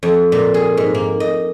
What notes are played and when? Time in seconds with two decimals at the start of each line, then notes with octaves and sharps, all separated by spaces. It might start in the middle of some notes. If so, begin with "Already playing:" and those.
0.03 F2
0.32 A#2
0.54 G#4
0.77 G#2
0.95 A#3
1.20 D#5